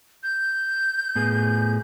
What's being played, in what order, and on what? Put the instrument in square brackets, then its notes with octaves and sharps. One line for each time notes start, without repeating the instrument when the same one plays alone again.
[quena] G6
[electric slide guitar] A2 B3 G#4